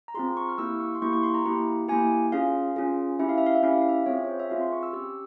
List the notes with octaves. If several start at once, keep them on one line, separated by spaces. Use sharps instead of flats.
A#5
C4 F4 G#4 C6
C#6
F6
A#3 E4 G4 E6
C#6
C6
A#3 E4 G4 C#6
C#6
C6
A#5
A#3 E4 G4
A#3 E4 G4 G#5
C#4 F4 G#4 F5
C#4 F4 G#4
C#4 E4 G4 E5
F5
E5
F5
E5
C#4 E4 G4 F5
E5
F5
E5
C4 F4 G#4 C#5
C#5
C5
E5
C4 F4 G#4 F5
C6
C#6
E6
C#4 G4 E6